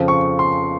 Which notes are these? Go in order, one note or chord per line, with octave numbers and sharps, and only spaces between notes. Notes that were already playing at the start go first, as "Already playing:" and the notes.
Already playing: F2 C#3 F3 C4
C#6
C6